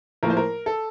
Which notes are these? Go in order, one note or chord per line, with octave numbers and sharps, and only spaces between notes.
A2 F3 A#3 A#4
C5
A#4
A4